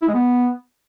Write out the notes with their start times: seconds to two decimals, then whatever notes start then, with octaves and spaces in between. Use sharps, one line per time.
0.02 E4
0.08 G#3
0.14 B3